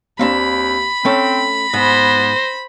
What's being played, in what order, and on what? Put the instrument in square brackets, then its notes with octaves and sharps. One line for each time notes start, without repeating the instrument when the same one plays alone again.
[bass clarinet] D#2 [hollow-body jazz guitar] A#3 C4 D4 [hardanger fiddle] B5
[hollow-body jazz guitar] A3 C#4 A4 [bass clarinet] C4
[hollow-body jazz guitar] G#2 [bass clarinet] B3 [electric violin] C5 A#6